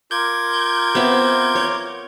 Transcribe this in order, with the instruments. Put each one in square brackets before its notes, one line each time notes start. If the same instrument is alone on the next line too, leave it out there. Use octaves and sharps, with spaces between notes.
[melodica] F4 A#4 D6 [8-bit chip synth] G6 G#6
[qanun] B3 C4 E5
C#5